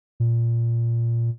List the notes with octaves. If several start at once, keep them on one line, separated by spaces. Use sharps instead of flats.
A#2